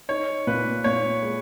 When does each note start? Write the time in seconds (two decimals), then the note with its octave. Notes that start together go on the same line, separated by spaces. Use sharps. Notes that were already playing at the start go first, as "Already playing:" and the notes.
0.09 D#4 C#5
0.47 A#2 B4
0.84 A#2 C#5
1.23 G#3